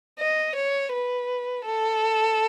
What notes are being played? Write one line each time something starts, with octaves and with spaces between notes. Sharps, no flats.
D#5
C#5
B4
A4